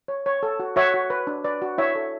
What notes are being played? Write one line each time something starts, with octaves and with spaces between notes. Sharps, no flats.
C#5
C#5
A4
F#4
F#4 C#5 E5
F#4
B4
D4
B4 D5
F#4
E4 C#5 E5
A4